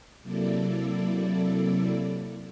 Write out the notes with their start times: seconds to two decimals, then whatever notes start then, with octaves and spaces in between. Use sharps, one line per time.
0.23 C3 F#3 A#3 E4 A4 D5